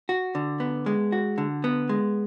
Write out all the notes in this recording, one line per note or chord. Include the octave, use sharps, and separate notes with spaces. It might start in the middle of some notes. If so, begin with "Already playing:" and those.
F#4
D3
B3
G#3
F#4
D3
B3
G#3